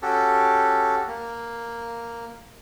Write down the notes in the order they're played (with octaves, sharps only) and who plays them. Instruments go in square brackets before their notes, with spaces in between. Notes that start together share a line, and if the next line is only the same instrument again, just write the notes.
[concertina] C#4 F#4 G4 A4
A#3